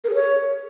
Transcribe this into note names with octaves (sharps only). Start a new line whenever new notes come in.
A#4
G#4
C#5